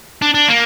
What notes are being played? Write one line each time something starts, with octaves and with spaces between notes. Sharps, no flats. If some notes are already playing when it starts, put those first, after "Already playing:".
D4
D4
A#3